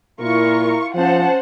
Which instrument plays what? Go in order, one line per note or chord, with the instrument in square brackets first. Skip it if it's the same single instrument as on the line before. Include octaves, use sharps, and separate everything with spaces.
[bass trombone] A#2 [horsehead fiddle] E4 A#4 [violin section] F4 C#6
[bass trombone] F3 [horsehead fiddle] C#4 A5 [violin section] C5 F#5